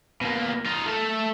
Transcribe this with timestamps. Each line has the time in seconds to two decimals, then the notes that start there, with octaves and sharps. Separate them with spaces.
0.22 B2 A#3
0.66 D#4 F4
0.86 A3 A4